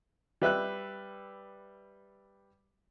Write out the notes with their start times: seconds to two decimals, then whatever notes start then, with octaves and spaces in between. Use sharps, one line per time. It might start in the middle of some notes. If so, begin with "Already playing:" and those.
0.42 G3 B4 E5 F#6